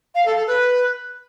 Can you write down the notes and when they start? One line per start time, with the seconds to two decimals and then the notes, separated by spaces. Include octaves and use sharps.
0.14 F5
0.25 A4
0.36 A4
0.47 B4